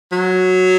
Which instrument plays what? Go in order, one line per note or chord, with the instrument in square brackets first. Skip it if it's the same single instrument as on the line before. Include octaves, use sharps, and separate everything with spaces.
[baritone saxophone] F#3